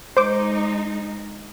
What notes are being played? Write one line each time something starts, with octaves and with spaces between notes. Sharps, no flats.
G#3 D#4 C5 D6